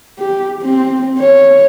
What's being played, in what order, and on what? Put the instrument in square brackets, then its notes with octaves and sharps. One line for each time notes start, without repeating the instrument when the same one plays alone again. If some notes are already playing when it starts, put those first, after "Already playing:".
[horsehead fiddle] G4
C4
C#5